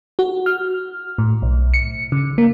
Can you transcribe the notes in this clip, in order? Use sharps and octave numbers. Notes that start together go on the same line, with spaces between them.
F#4
F6
A2
B1
C#7
C#3
A#3